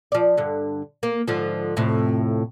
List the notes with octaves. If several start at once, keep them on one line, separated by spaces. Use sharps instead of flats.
F3 D5
G2 D3
A#3
G#2 D3 F3
F2 A2 C3